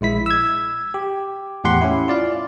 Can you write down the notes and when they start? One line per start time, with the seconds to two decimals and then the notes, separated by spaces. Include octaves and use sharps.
0.01 A#1 G#3 E4 B6
0.26 E6 G#6
0.94 G4
1.64 E2 A2 G4 F#5 C6
1.81 C#4 E4
2.08 F4 D5 F5